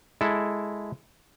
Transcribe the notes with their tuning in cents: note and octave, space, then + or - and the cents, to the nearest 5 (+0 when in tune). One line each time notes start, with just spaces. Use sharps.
G#3 +0 E4 +0 A4 +0